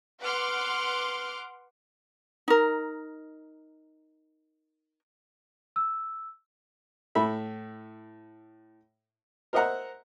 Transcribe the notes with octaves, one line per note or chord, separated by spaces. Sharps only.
B4 F#5 C6 D6 F6
D#4 A#4
E6
A2 A4 E5 B5
A#4 C5 D#5 E5 F#5 A#5